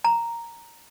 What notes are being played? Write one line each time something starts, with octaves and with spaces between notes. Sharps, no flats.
A#5